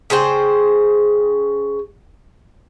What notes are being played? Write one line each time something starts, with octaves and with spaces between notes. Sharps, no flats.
C#3 G#4 C5 G5